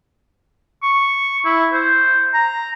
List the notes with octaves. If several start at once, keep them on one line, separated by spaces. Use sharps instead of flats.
C#6
E4
C5
A#5